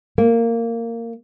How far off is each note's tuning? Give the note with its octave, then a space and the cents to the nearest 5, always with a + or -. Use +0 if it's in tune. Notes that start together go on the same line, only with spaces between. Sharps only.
A#3 -15